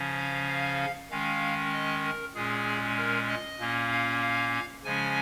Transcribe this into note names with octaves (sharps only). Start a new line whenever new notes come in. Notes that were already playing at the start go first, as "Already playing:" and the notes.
Already playing: C#3 F3 C#4
F5
F5
D#3 G#3 C#4 F5
D#5
A#4
A#2 G#3 C#4 G#4
A#4
D#5
A#2 A#3 C#4
F5
F5
C#3 F3 G#3 C#4 G#5